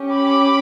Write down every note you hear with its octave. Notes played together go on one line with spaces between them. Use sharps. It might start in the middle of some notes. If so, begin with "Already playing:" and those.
Already playing: C#4 G4
B5 D6